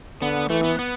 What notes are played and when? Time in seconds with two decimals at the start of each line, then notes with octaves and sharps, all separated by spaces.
0.22 D3 B3
0.50 E3 A3
0.64 B3
0.79 B3